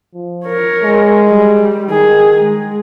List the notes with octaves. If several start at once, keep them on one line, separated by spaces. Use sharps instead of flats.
F3
A#4 C#5
G#3
G3
D#3 G#4
G#3